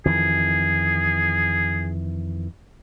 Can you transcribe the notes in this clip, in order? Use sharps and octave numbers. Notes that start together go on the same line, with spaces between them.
F2 D#3 E3 G#4